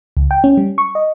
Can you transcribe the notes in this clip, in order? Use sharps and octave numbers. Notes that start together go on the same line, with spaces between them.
C#2
G5
C#4
G3
C#6
D#5